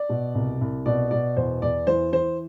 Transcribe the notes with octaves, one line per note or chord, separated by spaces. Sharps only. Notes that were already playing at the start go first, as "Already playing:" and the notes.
Already playing: D5
B2
C2
C2
B2 D5
B2 D5
E2 C5
E2 D5
E3 C5
E3 C5